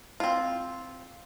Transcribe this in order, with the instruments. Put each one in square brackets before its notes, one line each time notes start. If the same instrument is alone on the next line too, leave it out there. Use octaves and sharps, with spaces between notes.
[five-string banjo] C4 F4